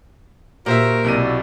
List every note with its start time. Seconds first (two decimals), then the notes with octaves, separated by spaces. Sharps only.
0.66 A#2 F#4 G4 A#4 C5 E5
1.04 B1 C3 E4 F#4 D5 D#7